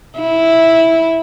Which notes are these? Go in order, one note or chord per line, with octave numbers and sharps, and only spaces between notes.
E4